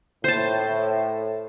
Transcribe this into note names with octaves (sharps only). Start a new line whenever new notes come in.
A2 C5 A5